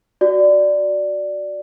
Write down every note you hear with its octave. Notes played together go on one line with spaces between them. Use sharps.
F#4 D5